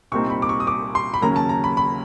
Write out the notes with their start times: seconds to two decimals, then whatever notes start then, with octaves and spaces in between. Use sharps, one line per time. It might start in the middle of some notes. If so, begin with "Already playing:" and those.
0.12 C2 A#2 G3 C4 D#4 C#6
0.30 B5
0.42 D6
0.49 C#6
0.60 D#6
0.67 D6
0.95 C6
1.14 B5
1.22 D#2 C#3 F#3 A#3 C#4 A#5
1.36 A5
1.49 A#5
1.64 B5
1.77 B5